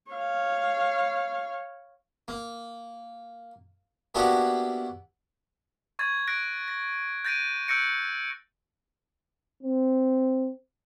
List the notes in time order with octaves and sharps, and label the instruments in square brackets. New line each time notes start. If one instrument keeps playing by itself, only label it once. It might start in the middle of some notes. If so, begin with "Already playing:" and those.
[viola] C#5 F5
[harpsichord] A#3
A#3 B3 D4 E4 F#4 G4
[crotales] C#6 G#6 A6
F#6 A#6 D7
A#6
G6 A6 A#6 D7 D#7
E6 F#6 G6 A#6 C#7 D7
[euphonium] C4